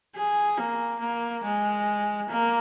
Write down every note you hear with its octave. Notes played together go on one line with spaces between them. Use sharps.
G#4
A#3
A#3
G#3
A#3